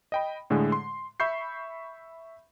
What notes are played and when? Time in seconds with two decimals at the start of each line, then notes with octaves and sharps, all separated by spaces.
0.12 D#5 G5 B5
0.50 A2 D3 G#3 G#4
0.72 C6
1.20 E5 B5 C#6 G6 C7